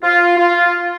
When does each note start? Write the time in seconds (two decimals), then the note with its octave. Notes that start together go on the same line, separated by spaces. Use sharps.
0.03 F4
0.37 F4